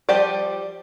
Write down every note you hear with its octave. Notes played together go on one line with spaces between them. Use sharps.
F3 G3 G4 C5 D5